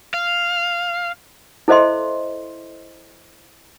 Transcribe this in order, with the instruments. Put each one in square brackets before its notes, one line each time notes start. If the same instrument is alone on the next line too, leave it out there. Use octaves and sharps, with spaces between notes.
[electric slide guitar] F5
[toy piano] E4 A4 C5 D#5 E5 C6